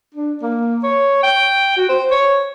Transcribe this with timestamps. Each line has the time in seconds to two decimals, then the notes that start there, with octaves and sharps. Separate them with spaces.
0.15 D4
0.42 A#3
0.83 C#5
1.23 G5
1.77 F#4
1.89 C5
2.11 C#5